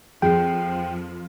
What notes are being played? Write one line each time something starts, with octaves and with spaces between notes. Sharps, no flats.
F2 F3 G#4 G5